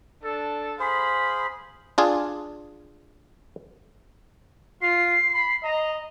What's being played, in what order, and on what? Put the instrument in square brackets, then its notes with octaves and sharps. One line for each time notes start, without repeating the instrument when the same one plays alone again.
[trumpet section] D4 A4
[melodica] G#4 C5 [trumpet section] F5 B5
[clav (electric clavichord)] D4 F4 G#4
[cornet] F4 [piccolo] C7
[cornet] B5
[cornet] D#5 [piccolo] A#5